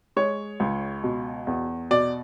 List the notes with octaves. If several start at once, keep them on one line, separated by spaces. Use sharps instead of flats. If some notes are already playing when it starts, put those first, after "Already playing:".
G#3 C#5
C#2
B2
E2
B2 D5